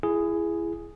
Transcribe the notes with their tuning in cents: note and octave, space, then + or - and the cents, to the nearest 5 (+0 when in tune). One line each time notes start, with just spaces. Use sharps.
E4 +25 G#4 +0